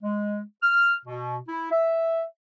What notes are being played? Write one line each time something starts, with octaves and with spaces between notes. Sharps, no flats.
G#3
F6
B2
E4
E5